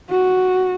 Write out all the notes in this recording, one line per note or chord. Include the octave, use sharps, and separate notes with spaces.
F#4